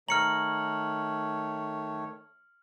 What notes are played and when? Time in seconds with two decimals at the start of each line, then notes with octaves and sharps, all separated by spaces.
0.09 D#3 A3 C#5 A#5 F6 C#7 F#7